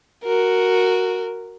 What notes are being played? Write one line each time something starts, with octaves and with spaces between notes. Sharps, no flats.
F#4 A#4